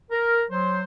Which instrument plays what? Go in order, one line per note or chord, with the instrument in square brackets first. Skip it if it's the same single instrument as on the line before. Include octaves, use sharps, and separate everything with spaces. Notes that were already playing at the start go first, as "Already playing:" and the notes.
[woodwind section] A#4
F#3 C5